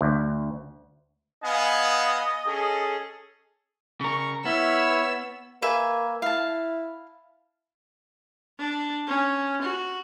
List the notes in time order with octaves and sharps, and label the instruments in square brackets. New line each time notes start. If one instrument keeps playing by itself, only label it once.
[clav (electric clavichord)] D2
[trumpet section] B3 F5 G#5 [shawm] D#5
[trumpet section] C#4 G#4 A4
[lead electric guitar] C#3 A#4 [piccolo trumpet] C#6
[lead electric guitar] B3 [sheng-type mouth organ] E4 B5 F6 [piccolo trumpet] C#5 [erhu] E6
[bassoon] A#3 [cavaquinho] B4 E5 G#5
[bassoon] E4 [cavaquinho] F5 A5
[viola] D4
C#4
F#4